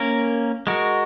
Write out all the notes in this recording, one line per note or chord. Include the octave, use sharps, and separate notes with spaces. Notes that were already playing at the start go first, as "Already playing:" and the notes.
Already playing: A#3 C#4 A#4
G#3 F#4 A#4